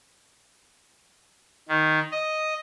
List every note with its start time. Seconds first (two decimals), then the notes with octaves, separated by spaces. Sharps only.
1.69 D#3
2.12 D#5